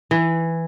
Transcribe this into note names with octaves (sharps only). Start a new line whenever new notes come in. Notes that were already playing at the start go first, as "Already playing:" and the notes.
E3